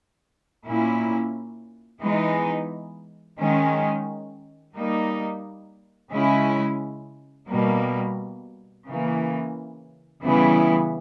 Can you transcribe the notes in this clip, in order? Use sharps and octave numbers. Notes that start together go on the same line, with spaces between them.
A#2 A#3 C#4 E4
E3 G#3 B3 D#4
D#3 G#3 C#4
G3 A#3 D#4
C#3 G#3 C#4 E4
B2 G3 A#3
C#3 E3 A#3
C#3 E3 G3 B3 E4